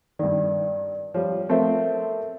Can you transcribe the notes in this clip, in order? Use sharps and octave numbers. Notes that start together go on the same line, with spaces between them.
G2 D#3 D5
F3 G3 C#5
F3 A3 C4 A4 A#4 E5